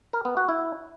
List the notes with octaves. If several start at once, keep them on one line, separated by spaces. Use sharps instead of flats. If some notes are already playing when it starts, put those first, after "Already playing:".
A#4
B3
F#4
E4